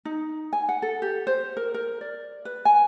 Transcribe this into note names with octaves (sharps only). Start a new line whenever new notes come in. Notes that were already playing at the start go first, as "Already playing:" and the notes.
D#4
G#5
F#5
A4
G4
C5
A#4
A#4
D5
B4
G#5